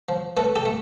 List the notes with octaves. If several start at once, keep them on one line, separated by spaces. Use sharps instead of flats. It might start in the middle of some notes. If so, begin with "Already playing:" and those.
F3
A3 A4 B4
G4 A4
A3